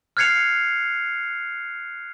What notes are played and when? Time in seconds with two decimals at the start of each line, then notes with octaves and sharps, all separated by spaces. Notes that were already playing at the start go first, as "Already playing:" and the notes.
0.17 F6 F#6 G#6 C7 C#7 F7